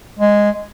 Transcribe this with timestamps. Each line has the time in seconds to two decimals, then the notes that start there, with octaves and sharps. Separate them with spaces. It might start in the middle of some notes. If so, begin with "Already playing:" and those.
0.19 G#3